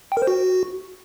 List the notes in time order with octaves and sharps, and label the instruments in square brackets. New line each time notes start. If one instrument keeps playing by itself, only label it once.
[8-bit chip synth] G5
A#4
C5
F#4